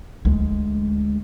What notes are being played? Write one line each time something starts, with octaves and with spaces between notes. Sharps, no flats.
D2 G#3